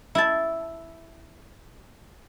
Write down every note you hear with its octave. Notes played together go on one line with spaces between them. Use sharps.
E4 A5